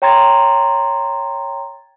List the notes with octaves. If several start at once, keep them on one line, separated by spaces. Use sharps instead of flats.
C#5 G5 A#5 C6 G#6 A6